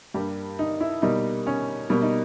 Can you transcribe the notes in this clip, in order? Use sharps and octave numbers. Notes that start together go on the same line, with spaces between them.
G2 G3 A#3 G4
D#4
E4
B2 G3 A#3 D#4
C#4
B2 G3 A#3
D#4